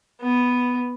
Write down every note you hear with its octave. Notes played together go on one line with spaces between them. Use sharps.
B3